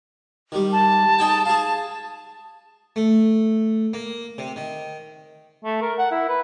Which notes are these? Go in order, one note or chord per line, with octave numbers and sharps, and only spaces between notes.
D#3 G3
A5
D#4 G#4 G5
G#4 F5
A3
A#3
C3
D#3
A3
A#4
F#5
E4
B4